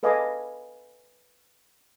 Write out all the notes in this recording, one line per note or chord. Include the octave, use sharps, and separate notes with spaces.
A4 B4 D#5 F5 G#5 D6